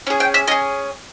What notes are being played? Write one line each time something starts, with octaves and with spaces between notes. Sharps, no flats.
C#4 G#4
G5
E5
C#4 G#4 D#5